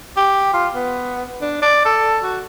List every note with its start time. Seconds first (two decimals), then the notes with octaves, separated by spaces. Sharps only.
0.17 G4
0.54 F4
0.75 B3
1.41 D4
1.62 D5
1.85 A4
2.23 F#4